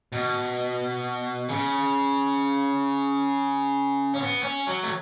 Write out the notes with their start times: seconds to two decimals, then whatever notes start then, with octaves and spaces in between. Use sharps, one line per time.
0.12 B2
1.49 C#3
4.14 C#4
4.22 B3
4.43 C#4
4.67 F#3
4.83 A3